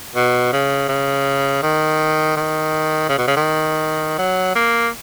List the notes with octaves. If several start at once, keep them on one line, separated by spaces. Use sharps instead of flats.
B2
C#3
C#3
D#3
D#3
C#3
B2
C#3
D#3
F#3
A#3